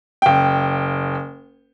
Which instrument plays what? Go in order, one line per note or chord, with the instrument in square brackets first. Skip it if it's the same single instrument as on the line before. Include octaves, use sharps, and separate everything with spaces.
[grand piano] F#1 G5